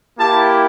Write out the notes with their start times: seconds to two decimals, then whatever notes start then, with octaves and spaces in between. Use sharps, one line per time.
0.19 A#3 E4 G4 A5